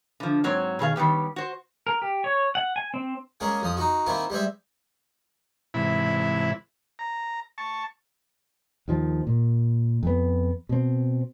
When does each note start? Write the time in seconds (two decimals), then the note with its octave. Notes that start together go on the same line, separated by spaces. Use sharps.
0.20 D3 F3
0.44 G#2 F#3 C4 C#5
0.79 B2 D#3 G#4 F5
0.96 D#3 G3 B3 G4
1.36 F#4 C5
1.87 A#4
2.02 G4
2.24 C#5
2.55 F#5
2.76 G#5
2.94 C4
3.40 G#3 A#3 C#4 G#4
3.62 F2 F3 D#6
3.77 D#4 F#4
4.07 D#3 A#3 C4 E4
4.30 G3 G#3 C5 E5
5.74 G#2 C3 E3 E4 B5
6.99 A#5
7.58 A5 C#6
8.88 D#2 D#3 F3
9.27 A#2
10.03 F2 B3
10.69 B2 C4